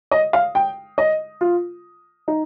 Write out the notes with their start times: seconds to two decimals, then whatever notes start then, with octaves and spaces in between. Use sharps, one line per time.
0.11 D#5
0.33 F5
0.55 G5
0.98 D#5
1.41 F4
2.28 D#4